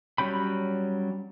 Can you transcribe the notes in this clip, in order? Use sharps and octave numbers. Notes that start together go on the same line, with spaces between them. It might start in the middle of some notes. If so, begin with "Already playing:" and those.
F#3 G3 C#4 G5 B5